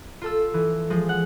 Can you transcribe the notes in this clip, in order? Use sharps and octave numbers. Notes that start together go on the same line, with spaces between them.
F4 A4 E6
E3
F3 G#3
F#5